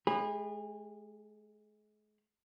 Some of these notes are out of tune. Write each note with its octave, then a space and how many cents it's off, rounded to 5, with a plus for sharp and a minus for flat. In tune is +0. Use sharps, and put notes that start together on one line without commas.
G#3 +35 G#4 -35 B5 +0